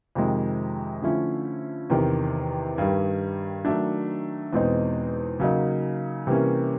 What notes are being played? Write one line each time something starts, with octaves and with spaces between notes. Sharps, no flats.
F2 C3 D#3 G#3
D3 F3 A3 C#4 E4
E2 C3 D#3
G2 D#3 G3
D#3 F#3 A3 D4
E2 B2 G#3 C4 D#4
C#3 F#3 A#3 D#4
C3 E3 G3 A#3 C#4